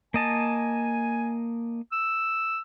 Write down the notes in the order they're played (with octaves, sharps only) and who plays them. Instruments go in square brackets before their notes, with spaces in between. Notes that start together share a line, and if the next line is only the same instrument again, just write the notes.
[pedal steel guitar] A#3 D#5 A5 [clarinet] G#5
[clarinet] E6